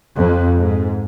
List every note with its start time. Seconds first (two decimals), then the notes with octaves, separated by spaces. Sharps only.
0.17 F2
0.59 G#2